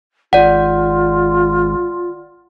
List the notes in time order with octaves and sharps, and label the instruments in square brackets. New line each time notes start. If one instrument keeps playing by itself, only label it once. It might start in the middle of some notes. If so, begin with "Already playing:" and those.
[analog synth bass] G#1 [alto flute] F4 [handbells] D5 F#5